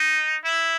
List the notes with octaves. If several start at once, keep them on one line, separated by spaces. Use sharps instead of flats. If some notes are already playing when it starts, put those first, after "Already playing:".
Already playing: D#4
E4